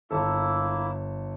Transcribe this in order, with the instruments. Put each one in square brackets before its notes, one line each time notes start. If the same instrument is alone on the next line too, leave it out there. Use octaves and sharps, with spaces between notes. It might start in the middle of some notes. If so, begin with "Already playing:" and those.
[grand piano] G1 A4 [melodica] A#3 E4 E6